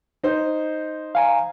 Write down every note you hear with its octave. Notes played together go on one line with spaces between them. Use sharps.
D#4 C5
F5 G#5 A#5